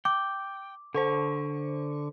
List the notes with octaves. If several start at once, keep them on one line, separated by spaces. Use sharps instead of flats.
G5 D6
D3 A4 C5 C#6